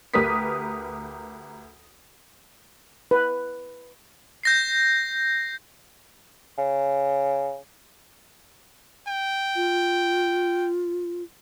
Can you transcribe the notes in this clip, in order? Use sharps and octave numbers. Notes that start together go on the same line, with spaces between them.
D2 G4 A#4 B4 D#6 B6
B4
G6 A#6 C7
C#3
G5
F4